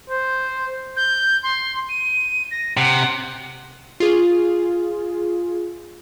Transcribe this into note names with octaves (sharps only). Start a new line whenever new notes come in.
C5
G6
C6
D#7
A#6
C3 F#5
F4 G#4